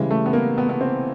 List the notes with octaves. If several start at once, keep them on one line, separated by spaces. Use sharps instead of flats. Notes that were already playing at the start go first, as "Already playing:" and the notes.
Already playing: C#3 E3 G3 G#3
A3
B3
A#3
B3
B3
C4